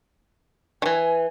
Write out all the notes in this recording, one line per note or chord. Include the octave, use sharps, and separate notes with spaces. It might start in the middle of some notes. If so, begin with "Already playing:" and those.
D#3 E3 G#5